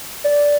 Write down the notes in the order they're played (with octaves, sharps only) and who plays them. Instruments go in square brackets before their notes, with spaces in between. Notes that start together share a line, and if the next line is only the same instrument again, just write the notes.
[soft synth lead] D5